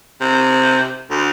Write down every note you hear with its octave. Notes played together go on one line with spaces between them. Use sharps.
C3
D2